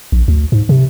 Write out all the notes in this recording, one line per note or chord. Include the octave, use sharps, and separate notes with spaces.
A#1
D2
G#2
C3